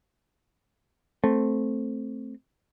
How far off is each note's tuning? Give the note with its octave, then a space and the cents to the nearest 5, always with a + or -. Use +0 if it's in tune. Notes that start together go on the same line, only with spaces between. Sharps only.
A3 +0 C4 +0